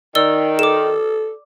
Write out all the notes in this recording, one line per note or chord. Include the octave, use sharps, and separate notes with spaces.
D#3 D5 E6 G7
A4 D6 E7